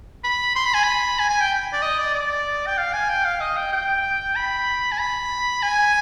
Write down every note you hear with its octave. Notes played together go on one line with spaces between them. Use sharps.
B5
C6
B5
G#5
B5
G#5
G#5
G5
D5
D#5
D5
D5
G5
F5
G#5
G5
F5
D#5
G5
G5
B5
G#5
B5
G#5